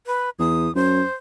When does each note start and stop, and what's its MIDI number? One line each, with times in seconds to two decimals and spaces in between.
0.06 0.30 71
0.39 0.69 40
0.39 0.74 87
0.75 1.02 42
0.75 1.14 72